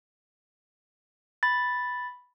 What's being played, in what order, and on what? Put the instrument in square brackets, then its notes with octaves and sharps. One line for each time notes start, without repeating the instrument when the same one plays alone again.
[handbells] B5 A6